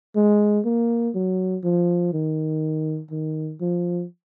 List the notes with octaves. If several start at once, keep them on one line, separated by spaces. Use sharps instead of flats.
G#3
A#3
F#3
F3
D#3
D#3
F3